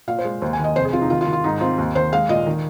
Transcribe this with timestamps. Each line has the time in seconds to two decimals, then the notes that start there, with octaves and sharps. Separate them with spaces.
0.08 A#2 F5
0.19 C5
0.25 G#3
0.42 D#2 C5
0.53 G#5
0.59 D#3
0.64 D#5
0.76 F1 C5
0.85 G#4
0.93 C3 F4
1.01 D#4
1.10 D#3 F4
1.21 F4
1.27 D#3
1.33 F4
1.44 G#2 D#4
1.61 C4 F4
1.78 D#2
1.95 D#3 C5
2.12 G#3 F5
2.29 A#2 D#5
2.46 D#3